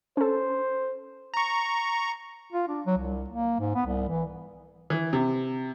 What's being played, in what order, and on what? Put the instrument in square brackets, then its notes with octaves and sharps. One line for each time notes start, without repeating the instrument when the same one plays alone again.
[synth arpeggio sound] C#4 A4 [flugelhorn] C5
[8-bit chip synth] A#5 C#6
[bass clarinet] F4
D4
F#3
C2
A#3
G#2
B3
C2
E3
[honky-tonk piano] E3
C3